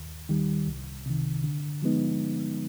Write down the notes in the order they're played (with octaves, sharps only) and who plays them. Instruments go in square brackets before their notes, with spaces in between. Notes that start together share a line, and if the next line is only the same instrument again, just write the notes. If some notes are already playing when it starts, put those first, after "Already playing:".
Already playing: [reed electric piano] D#2
D#3 G3
C2
C3 D#3
D3
F3 G#3 B3 D#4